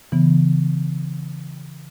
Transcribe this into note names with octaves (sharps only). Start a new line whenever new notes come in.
C#3 E3 B3